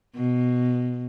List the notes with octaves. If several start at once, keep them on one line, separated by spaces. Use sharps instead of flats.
B2